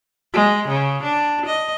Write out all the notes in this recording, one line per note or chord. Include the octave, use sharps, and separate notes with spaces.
G#3
C#3
D4
D#5